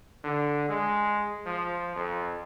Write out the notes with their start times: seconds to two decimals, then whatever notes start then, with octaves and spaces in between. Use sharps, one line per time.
0.24 D3
0.69 G#3
1.46 F3
1.96 F2